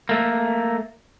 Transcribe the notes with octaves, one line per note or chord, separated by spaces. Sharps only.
A3 A#3